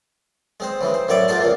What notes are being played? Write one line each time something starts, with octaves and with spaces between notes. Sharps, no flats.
G#3 C4 C5
C#3 E3 G#3
C5
F#2 A2 C#5 D5 E5 D6
G#2 A3 F4 A4 A5 C6
C#2 A#2 A#3